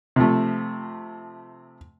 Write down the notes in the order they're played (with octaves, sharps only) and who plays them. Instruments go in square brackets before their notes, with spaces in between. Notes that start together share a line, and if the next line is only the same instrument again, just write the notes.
[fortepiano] C3 F3 A3